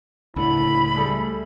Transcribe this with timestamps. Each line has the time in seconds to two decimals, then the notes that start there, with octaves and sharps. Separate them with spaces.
0.36 C#2 A2 D3 E4 A4 B5
0.96 G3 A3 G#4 A4